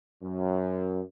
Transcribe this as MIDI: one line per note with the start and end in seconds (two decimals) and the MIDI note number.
0.22 1.02 42